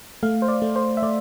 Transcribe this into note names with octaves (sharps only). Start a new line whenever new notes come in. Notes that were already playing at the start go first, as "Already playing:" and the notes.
A3 F5
C5
D5
A3
C5
E5
A3 D5